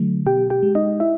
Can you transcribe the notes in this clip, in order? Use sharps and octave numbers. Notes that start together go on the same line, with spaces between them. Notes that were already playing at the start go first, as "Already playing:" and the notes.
Already playing: D3 F#3 A3
B2 G4 G5
G4 G5
G#3
D#4 D#5
E4 E5